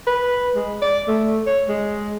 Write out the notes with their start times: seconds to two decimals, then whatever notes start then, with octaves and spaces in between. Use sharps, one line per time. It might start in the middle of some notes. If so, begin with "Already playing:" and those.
0.07 B4
0.55 G#3
0.82 D5
1.08 A3
1.46 C#5
1.68 G#3